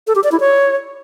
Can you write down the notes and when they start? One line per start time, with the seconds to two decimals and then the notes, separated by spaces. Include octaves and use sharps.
0.07 A4
0.15 G4
0.24 D5
0.32 E4
0.40 C#5